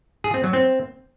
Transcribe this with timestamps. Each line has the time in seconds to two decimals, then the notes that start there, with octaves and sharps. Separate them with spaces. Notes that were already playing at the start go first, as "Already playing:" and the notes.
0.24 G#4
0.34 C4
0.44 F#3
0.53 C4